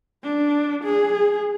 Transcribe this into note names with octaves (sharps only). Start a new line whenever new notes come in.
D4
G#4